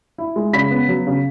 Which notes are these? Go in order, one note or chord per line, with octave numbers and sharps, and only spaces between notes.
E4
G#3
C#3 B5 B6
B3
F#3
C#3